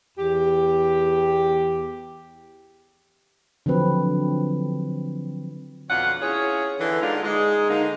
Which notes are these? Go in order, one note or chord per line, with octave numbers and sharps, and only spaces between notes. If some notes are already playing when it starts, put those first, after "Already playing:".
E2 G4
D3 F3 F#3 C4 B4
F2 B2 D4 F4 C#5 F#5
C#4 E4 F4 G#4 C#5
D3 E3
D3 G#3 A#3 D4 D#4 F4
G#3 D#4
D3 A#3 D#4